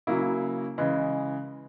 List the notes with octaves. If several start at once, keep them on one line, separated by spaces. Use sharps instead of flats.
C#3 F#3 A#3 E4
C#3 E3 G#3